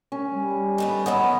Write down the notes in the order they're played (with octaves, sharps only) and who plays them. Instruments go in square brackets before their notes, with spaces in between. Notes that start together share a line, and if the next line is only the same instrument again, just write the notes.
[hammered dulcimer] C#4
[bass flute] G3
[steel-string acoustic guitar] D#3 A3 B3
[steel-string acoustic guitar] D#3 F#3 C#4 [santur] B3